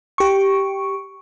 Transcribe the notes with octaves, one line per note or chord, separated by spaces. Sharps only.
G4 C#6